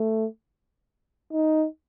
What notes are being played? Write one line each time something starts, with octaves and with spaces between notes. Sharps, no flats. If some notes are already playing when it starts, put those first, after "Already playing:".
Already playing: A3
D#4